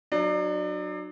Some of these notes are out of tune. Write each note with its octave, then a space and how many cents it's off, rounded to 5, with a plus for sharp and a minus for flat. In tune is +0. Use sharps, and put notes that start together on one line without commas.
F#3 +0 D4 +35